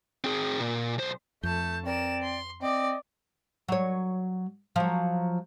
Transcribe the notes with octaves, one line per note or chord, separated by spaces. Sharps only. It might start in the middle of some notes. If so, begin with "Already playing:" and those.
C4 G#4
A#2
B1 C5
F2 A3 A5 G6
C4 A#4 D5 E7
C6
C4 D5 D#5
F#3 C#5
F3 F#3